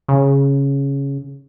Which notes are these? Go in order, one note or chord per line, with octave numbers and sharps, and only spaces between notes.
C#3